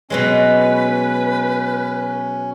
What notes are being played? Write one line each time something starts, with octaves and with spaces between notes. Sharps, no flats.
B2 F#3 G#3 C#4 B4